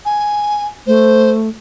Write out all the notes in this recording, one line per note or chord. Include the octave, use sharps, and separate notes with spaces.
G#5
A3 C5